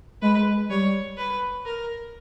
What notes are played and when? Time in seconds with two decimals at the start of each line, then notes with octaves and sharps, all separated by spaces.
0.22 G#3 B4
0.70 G3 C#5
1.17 B4
1.65 A#4